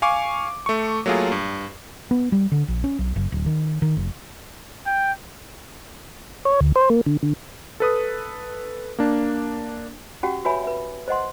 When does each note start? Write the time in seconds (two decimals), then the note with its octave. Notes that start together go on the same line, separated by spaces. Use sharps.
0.02 F5 G#5 C#6 D6
0.66 A3 C#6
1.06 F#3 A3 A#3 F4 G#4
1.32 G2
2.11 B3
2.32 G3
2.52 D3
2.68 A#1
2.84 C#4
2.99 B1
3.16 F#1
3.32 D1
3.46 D#3
3.82 D#3
3.96 F1
4.87 G5
6.45 C#5
6.61 D2
6.76 C5
6.90 A#3
7.06 D3
7.23 D3
7.80 A4 B4 D#6
8.99 A#3 D4
10.23 C#4 F#4 G4 F#5 G5
10.45 F#4 B4 C#5 E5 G#5 B5
10.64 B4 E5
11.08 C5 D#5 F#5 C6